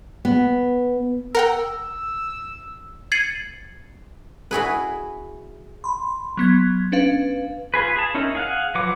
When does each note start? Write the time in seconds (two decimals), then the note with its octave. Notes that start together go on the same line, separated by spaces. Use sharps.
0.25 B3
1.35 A#4 F#5 G5 E6
3.12 G#6 A6 C7 C#7 D#7 F#7
4.51 E4 F#4 G#4 B4
5.84 B5 C6
6.37 F#3 B3 G#6
6.92 C#4 D4 B4 F5
7.74 F4 G#4 B4
7.96 G#4 A5
8.15 C#4 D#4 E4 A#4
8.35 G#4 F5 F#5
8.75 F3 F#3 B4 F#5 D6